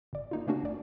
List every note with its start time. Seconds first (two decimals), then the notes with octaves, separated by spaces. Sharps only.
0.13 G1 D5
0.31 A#3 D#4 F4
0.47 C#3 A3 A#3 C#4 D4 F#4
0.63 G1 D5